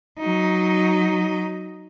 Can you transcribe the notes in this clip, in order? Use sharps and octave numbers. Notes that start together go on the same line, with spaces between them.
F#3 D#4